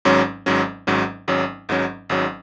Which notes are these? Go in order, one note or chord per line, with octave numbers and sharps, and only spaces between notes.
G#1 G#2 F#3 C#4
G#1 G#2 F#3 C#4
G#1 G#2 F#3 C#4
G#1 G#2 F#3 C#4
G#1 G#2 F#3 C#4
G#1 G#2 F#3 C#4